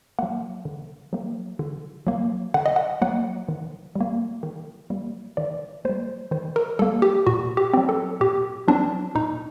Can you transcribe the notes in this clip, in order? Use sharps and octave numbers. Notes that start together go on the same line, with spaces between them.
F#3 A#3 F#5
D3
F#3 A#3
D3
F#3 A#3
D3 F#5
D#5
F#5
F#3 A#3 F#5
D#3
G3
A#3
D#3
G3 A#3
D#3 D5
G3 A#3 C5
D#3 C5
A#4
G3 A#3 A4
G4
A#2 F#4
G4
F#3 C4
A4
A#2 G4
F#3 C4 D4
A#2 D#4